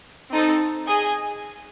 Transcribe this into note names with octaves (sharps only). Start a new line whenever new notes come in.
C4 D#4 A4
G#4 D#5 G#5